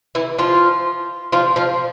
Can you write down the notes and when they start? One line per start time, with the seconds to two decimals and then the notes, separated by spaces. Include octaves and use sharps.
0.15 E3 E4
0.38 F3 F4
1.32 F3 F4
1.56 F3 F4